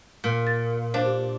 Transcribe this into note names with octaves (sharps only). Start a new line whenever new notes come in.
A#2
A6
D4 C5 F5
G4